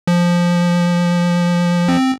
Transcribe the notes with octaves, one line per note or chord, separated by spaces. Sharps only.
F3
C4